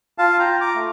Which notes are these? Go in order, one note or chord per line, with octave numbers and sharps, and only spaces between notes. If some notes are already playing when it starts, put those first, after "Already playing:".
F4 F5 A5
G5 A#5
F4
A#5 D6
A3